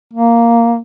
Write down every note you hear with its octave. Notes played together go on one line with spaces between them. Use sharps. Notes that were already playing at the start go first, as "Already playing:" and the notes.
A#3